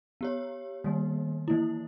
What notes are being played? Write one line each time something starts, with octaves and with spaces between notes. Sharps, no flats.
B3 G4 C#5
D#3 G3 A#3
E3 A#3 E4